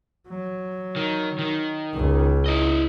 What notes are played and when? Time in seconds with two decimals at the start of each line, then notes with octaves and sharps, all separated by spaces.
0.28 F#3
0.96 D#3
1.39 D#3
1.94 C#2
2.46 E4 D#5